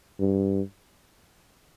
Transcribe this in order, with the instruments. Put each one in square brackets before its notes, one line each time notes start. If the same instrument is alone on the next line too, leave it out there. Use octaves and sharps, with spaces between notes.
[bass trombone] G2